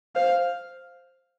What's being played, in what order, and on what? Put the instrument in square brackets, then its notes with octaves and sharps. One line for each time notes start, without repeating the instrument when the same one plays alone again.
[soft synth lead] C5 [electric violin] F5